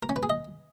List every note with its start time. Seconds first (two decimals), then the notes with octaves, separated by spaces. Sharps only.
0.03 A#4
0.09 C#4
0.16 B4
0.23 G#4
0.30 D#5